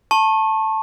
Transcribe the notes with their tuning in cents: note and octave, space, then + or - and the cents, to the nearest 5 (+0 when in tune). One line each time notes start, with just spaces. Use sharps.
A5 +0 C#6 -30